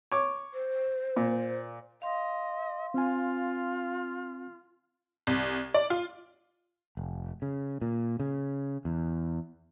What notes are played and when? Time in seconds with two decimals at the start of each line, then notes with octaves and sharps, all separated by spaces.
0.11 C#5 D6
0.54 C5
1.16 A#2
2.02 D#5 F5 C6
2.94 C4 F4 G#5
5.27 C2
5.74 D5
5.90 F4
6.97 F1
7.42 C#3
7.82 A#2
8.20 C#3
8.85 E2